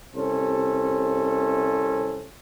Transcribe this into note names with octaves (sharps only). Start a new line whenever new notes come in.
C2 C3 C#4 A4 C5